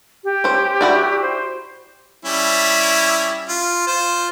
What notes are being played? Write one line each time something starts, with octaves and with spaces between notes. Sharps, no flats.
G4
C#4 C5
E4 F#4 D5
C5
G3 C#4 E4
F4
F4 C5